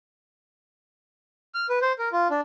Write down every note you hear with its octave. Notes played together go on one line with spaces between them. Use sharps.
F6
B4
C5
A#4
F4
D4